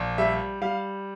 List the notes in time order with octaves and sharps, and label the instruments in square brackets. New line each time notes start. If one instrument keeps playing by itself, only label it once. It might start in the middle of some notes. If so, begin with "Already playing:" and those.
Already playing: [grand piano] A#1
G3 E5
G3 F5